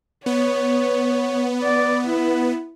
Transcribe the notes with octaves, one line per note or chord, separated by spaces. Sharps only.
B3 C#5
D5
E4